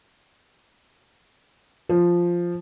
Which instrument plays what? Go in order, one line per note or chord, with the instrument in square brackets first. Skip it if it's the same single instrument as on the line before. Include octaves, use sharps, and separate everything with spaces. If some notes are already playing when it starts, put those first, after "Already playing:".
[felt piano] F3